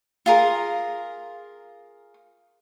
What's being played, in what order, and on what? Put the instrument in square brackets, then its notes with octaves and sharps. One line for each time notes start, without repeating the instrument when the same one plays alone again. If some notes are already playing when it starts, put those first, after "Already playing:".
[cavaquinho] F4 G#4 A#4